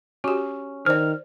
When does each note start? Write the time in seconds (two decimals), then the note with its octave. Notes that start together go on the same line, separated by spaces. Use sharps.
0.24 C#4 F#4 G4
0.86 D#3 C5 D5 F6